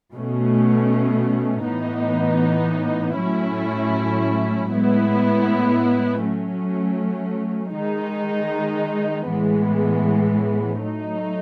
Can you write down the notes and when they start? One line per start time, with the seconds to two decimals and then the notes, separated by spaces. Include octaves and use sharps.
0.14 B2 A3 C#4
1.66 A2 E3 B3 D#4
3.17 A2 F#3 A3 C#4 E4
4.70 A2 G#3 B3 E4
6.22 F#3 A3 C#4
7.74 D#3 G#3 D#4
9.27 A2 E3 G#3 B3
10.79 F#3 A3 D#4